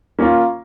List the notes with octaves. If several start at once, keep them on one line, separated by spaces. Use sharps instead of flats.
A#3 C#4 F4